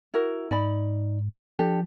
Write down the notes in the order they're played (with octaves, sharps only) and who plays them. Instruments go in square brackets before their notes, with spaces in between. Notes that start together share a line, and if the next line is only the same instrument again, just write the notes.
[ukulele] E4 F#4 A#4
[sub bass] G#2 [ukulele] D#4 D5 B5
[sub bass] F3 [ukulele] D4 G4 A4